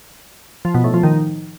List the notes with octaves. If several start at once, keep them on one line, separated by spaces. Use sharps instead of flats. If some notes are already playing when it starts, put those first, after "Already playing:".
F3
B2
A2
F3
D#3